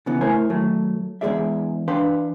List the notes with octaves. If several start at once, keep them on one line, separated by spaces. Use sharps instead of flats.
C#3 E3 B3
A3 E4 A#4 C5 C#5 G#5
D#3 F#3 A3
E2 F3 G#3 G#4 D5 E5
E3 D4 B4 F5 G5 C6